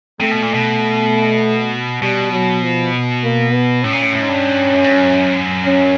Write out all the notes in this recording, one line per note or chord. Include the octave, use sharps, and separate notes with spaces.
C3 A3
B2
A#2
B2
B2 G3
F#3
F3
A#3
B3
A2 C#4
A#2
A2
A2
G#2
G2
F#2
G2
F#2
C#4